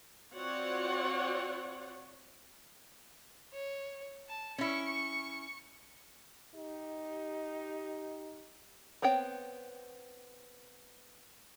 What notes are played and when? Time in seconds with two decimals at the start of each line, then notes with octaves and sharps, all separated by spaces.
0.34 C4 F4 F#4 C#5 D5 F#5
3.54 C#5
4.29 A5
4.58 C#4 E4 C#6 C#7
6.55 D#4 G4
9.02 B3 C4 C#5 G5